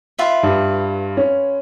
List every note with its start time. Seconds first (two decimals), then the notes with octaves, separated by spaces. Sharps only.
0.19 F4 B4 E5
0.43 G2
1.17 C#4